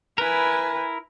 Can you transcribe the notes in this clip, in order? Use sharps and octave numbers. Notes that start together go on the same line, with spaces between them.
E4 A#4 B4 G#5